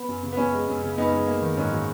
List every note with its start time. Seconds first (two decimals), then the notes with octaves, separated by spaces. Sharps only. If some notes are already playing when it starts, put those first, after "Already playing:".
Already playing: B3
0.08 F#2
0.23 C#3
0.32 B3
0.37 F#2 C#4
0.53 G#3
0.68 F#2
0.83 C#3
0.98 F#2 B3 D#4
1.13 G#3
1.27 A#3
1.42 D#3
1.57 G#2 C#4
1.72 F#3